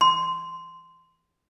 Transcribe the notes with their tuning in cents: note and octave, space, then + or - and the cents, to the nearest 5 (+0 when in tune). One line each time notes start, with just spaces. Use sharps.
C6 -15